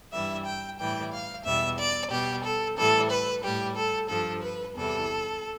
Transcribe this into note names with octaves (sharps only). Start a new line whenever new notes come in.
G2 E3 G3 E5
G5
A2 E3 G3 G5
F5
E2 B2 G3 E5
D5
B2 G3 G4
A4
A2 E3 G3 A4
B4
A2 G3 G4
A4
G2 F3 A4
B4
E2 C3 E3 G3 A4